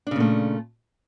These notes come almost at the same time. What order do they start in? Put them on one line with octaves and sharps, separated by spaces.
D4 C#3 A#2 A3